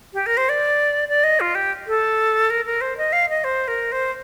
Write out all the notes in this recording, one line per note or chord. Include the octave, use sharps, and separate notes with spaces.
G4
A#4
C5
D5
D5
D#5
F4
G4
A4
A#4
A#4
C5
D#5
F5
D#5
C5
A#4
C5